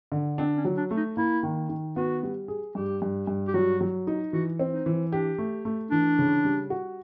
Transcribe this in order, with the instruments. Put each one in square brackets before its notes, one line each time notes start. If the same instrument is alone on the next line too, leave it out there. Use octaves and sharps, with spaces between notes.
[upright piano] D3
[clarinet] C4 [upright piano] D4
[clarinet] C#4
[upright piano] F#3
[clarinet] D4
[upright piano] A3
[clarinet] D#4
[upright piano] A#3 [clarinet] E4
[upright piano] D#3
D#3
[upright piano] B3 [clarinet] F#4
[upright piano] G3
G#4
[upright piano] G2 [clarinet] G4
[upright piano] G2
G2
[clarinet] G4
[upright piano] F#3 [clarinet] F#4
[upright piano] F#3
D#4
[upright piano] E3 [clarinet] F#4
[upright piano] C4
[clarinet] D#4
[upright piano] E3
[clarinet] D4 [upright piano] G4
[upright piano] A3
A3
[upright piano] E3 [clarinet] D4
[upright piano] C#3
G3
F#4